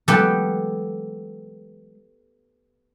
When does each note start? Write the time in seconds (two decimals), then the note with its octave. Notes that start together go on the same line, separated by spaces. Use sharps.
0.08 E3 F#3 G#3 B3 G4 A4